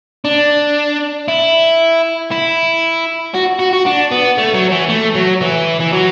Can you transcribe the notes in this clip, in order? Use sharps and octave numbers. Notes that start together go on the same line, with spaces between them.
D4
E4
E4
F#4
F#4
F#4
D4
B3
A3
F#3
E3
A3
F#3
E3
E3
F#3